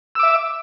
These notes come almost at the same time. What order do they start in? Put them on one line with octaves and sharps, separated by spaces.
E6 D6 E5